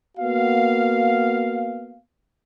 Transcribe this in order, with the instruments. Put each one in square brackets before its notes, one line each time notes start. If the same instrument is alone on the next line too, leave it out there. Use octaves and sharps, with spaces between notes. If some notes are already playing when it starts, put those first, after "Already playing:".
[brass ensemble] A#3 B3 F#4 F5